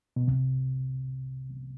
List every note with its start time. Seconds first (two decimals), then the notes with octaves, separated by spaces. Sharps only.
0.16 B2
0.28 C2 C3